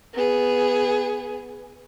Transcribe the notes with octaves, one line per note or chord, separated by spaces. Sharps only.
B3 G#4